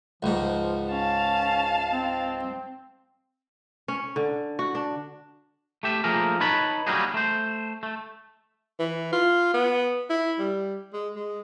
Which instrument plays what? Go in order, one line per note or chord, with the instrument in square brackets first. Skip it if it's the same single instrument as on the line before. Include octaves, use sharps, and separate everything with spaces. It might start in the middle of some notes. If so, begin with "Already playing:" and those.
[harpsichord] C#2 G#2 [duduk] F3
[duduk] C#4 [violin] F5 A5
[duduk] C4
[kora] C#4
D3
F#4
D4
[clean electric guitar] A3 G4 E5
F3 A3 A#3 G#4 A#4
D#4 B4 C#5 A5 B5
F#3 G3 A#3 D#4 F#4 G#4
A3 C5
A3
[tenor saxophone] E3
F4
B3
E4
G3
G#3
G#3